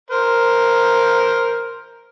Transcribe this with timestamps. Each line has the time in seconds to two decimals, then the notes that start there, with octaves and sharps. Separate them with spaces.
0.11 A#4 C5